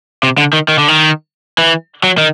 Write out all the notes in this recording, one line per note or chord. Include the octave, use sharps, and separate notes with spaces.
C3
D3
D#3
D#3
D3
D#3
E3
F#3
D#3